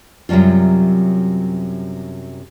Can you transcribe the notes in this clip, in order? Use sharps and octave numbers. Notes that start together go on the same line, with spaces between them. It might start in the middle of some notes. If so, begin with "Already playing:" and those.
F#2 C3 F#3 G3 F4